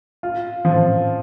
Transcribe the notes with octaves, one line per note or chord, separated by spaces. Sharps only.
F4
F3